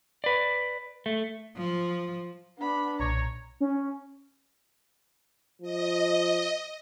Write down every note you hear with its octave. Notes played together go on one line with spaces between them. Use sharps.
B4 D5
A3
F3
B3 D4 B5
B1 A#2 C#5 A#5
C#4
F3 D#5